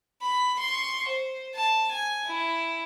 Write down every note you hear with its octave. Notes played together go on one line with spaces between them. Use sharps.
B5
C6 C#6
C5
A5
G#5
E4